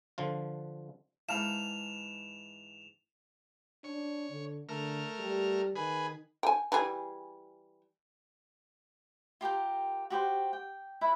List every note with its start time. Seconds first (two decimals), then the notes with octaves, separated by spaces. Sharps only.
0.18 D3 F3 F4
1.29 G#2 E3 F5 A5 F6 E7 F7
3.84 D4 C#5
4.31 D3
4.69 D3 A3 A#4 F6
5.19 G3
5.76 D#3 G#4 B4
6.43 G5 G#5
6.72 E3 G3 G#4
9.41 F4 G4 A#4 G5
10.10 F#4 G4 C5 G5
10.53 G5
11.01 E4 B4 E5